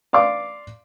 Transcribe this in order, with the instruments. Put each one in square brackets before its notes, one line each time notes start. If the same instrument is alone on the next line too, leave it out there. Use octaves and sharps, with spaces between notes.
[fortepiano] D5 F5 C6 D6